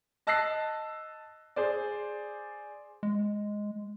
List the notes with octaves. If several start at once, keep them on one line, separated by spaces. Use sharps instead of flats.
D#5 A5 E6 F#6 A#6 C7
G#4 C5 D5
G#3